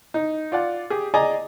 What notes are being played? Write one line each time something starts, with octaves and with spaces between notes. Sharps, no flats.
D#4
F4 D5 F#5
G4 G#4
G#4 D5 D#5 G#5 A#5